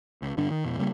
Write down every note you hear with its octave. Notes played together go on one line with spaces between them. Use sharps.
C#2
G1 G2 D3 D4
D#3
F2 B2
C#3 G3 A#3